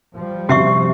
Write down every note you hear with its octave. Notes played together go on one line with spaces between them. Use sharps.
F3 G3
C3 F#4 E5 C#6 C7